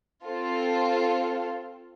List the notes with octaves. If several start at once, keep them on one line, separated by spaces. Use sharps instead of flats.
C4 F4 A4